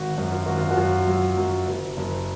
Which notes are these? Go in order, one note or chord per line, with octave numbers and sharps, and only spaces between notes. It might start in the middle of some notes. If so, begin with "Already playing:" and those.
Already playing: G#1 F#4
F#2
F4
G#1 F#4
F4
F#4
F#2 F4
F#3
F#2
F#1
F#1